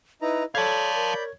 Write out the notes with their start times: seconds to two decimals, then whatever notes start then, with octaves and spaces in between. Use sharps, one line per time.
0.22 D#4 E4 B4 A#5
0.55 A4 C#5 D5 F5 A5 B5 G6 G#6
0.95 A#4